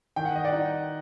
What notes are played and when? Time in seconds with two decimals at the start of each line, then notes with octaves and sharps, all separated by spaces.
0.16 D#3 G5
0.25 F#5
0.35 D#5
0.45 D5 F#5
0.52 D#4